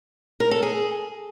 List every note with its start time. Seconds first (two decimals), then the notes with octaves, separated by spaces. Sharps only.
0.40 A#4
0.51 A4
0.63 G#4